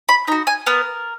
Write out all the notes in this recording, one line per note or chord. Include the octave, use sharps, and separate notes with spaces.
B5
D#4 F#4 A#5
G#5
B3 A#4